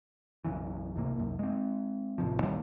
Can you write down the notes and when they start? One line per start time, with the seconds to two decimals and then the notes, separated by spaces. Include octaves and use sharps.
0.45 B1 F#2 C#3 E3
0.96 G1 C#2 C3 A#3
1.17 C2 F#2
1.39 G#3 C4
2.18 D1 A1 C3 F3
2.39 A#1 D#2 F3 G3